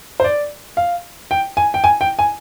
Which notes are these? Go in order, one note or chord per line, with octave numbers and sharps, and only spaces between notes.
C5
D5
F5
G5
G#5
G5
G#5
G5
G#5